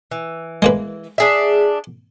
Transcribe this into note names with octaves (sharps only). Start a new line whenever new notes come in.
E3
G#3 A#3 B4
D4 G#4 E5